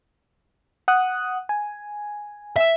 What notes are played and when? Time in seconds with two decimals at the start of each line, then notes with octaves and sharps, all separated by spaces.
0.88 F#5 D#6 F#6
1.49 G#5
2.56 E5